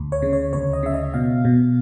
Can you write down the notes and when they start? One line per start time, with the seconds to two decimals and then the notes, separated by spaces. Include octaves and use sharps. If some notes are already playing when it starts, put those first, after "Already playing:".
Already playing: D2
0.12 C#5
0.22 C#3
0.33 C#5
0.53 D2 C#5
0.73 D#5
0.83 C#3 E5
0.94 D#5
1.14 B2 F5
1.45 B2